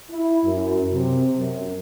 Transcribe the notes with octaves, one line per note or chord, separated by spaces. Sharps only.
E4
F#2
C3
F#2